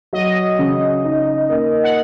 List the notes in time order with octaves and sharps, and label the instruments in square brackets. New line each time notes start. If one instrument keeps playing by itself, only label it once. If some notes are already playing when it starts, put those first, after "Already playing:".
[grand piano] F#3 [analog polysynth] D#5
[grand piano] C#3
D#4
A#3
[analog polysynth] F#5